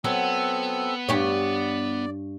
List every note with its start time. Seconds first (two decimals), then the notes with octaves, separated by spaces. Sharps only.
0.04 F#3 B3 C4 A4 E6
1.09 G2 G4 C#5 D5